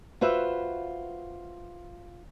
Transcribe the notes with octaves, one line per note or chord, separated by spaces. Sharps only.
F4 F#4 B4 C5 E5